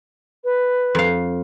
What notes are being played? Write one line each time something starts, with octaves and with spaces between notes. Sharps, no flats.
B4
F2 F5